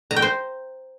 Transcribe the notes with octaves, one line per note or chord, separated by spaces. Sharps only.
A#5
G5
C5